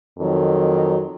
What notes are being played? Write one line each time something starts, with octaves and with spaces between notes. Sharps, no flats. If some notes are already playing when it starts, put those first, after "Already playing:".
F2 D#3 F#3